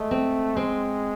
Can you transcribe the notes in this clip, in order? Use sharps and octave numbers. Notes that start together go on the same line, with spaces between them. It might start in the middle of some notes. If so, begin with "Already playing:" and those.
Already playing: G#3 A3
C4
G#3 C4